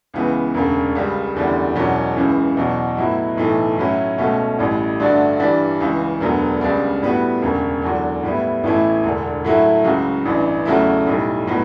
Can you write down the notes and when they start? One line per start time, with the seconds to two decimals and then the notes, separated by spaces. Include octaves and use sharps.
0.14 C#2 C#3 E3 B3
0.54 E1 D2 C#3
0.95 C#2 C#3 G3
1.35 F#1 E2 D3 G3
1.75 E1 E2 B2 F#3 C#4
2.16 C#2 C#3 E3
2.57 E2 B2 F#3
2.97 A2 F#3 B3 E4
3.37 B1 A2 E3 A3
3.77 A2 F#3 C#4 E4
4.18 C#2 B2 A3 C#4 F#4
4.58 A1 A2 G3
5.00 G2 D3 A3 D4 F#4
5.39 G2 E3 G3 D4
5.80 C#2 C#3 E3
6.21 E1 D2 D3 F#3 B3
6.61 C#2 C#3 G3 D4
7.02 A2 G3 B3 F#4
7.42 E1 D2 C#3
7.82 E2 D3 F#3
8.23 A2 G3 B3 E4
8.63 A1 A2 E3 A3 E4
9.03 E1 D2 D3
9.44 A2 F#3 A3 E4
9.85 C#2 C#3 F#3
10.25 A1 G2 E3
10.65 E2 C#3 F#3 A3 E4
11.07 B1 A2 G3
11.47 A2 F#3 B3